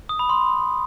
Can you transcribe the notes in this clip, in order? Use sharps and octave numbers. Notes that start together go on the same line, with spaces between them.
D#6
B5
C6